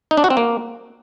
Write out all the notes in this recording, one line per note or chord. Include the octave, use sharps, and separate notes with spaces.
D#4
D4
F#4
C4
A#3